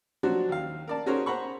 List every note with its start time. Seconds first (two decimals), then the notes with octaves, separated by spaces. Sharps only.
0.23 F3 F#3 D4 F#4
0.49 D#2 F5
0.87 A#4 D5 A5
1.06 C#4 F#4 G#4 A#4 C5 C#5
1.26 C5 F#5 A#5 B5 C#6